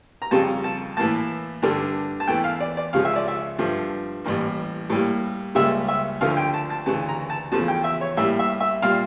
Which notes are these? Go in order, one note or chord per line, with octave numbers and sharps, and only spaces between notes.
A#5
F2 C#3 G3 A5
A5
A2 E3 A#3 A5
G2 D3 A3
A5
E2 E3 A3 G5
F5
D5
D5
C#2 C#3 F3 F5
E5
D5
E5
G2 F3 A3
A1 A2 G3 A#3
A2 G3 A#3
C#2 C#3 G3 A#3 E5
E5
D2 D3 F3 A3 F5
G5
A5
A5
D2 C#3 E3 A5
A#5
A5
E2 C#3 F3 A3 A5
G5
E5
C#5
A2 G3 A#3 E5
E5
E5
A#2 G3 F5